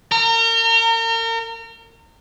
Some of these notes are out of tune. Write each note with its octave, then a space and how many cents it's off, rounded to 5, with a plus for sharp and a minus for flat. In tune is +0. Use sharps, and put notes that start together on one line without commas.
A#4 -35 A#5 -30